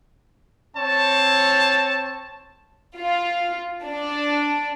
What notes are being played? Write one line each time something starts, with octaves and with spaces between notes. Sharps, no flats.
C4 C#5 A5
F4
D4